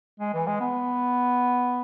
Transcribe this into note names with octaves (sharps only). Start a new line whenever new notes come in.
G#3
E3
G#3
B3